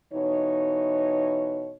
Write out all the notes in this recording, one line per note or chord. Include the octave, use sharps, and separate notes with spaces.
B2 E3 D#4 C#5